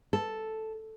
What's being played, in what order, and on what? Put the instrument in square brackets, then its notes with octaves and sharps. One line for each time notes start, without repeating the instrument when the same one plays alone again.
[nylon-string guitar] A4